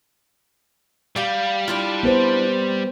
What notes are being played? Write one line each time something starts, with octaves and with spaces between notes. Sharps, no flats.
G3 G4 F5
D4 E4 F4
B3 B4 C5